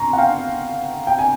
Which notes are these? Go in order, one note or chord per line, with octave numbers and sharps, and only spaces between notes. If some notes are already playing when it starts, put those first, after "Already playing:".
Already playing: G#5 A#5 C6 C#6
F#5
F5 G5
G5
G#5